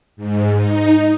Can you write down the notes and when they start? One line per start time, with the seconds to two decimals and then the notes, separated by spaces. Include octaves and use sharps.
0.16 G#2
0.54 D#4